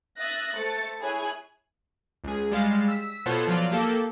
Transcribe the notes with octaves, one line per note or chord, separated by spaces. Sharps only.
E5 D#6 F#6 A6 A#6
A3 C5 A6 C#7
E4 G#4 C#5 G#5 F#6
C#2 G#4
G3 G#3 F5 A6
E6 B6
B2 B3 F4 A4 C5 C#5
F3 F#3 F4 D5
A#3 G4 A4 E6